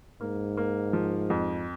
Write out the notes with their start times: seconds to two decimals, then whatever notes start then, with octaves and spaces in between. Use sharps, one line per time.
0.21 G#2 A#3
0.57 A#3
0.93 F3
1.30 F2